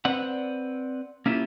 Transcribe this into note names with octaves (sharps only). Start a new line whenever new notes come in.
C4 B4 D5 F#5
A#3 C#4 E4 F4 G4